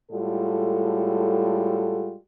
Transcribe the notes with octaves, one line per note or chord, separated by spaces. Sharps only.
A2 G3 G#3 F4 F#4 A4